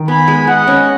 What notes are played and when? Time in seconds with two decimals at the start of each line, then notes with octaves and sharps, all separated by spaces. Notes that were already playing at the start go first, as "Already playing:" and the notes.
Already playing: D#3 D#4
0.08 B3 G#5 B5
0.28 G#3
0.47 G#3 D#5 F#5
0.67 C#4